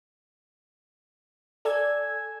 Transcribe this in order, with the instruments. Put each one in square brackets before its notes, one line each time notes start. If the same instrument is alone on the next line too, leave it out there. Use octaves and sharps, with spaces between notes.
[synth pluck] A4 D5 G#5 E6 G#6